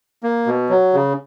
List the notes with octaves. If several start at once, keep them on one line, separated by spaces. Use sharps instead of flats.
A#3
B2
F#3
C#3